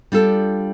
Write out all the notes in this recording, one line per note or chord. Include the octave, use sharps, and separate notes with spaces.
G3 D4 F4 A4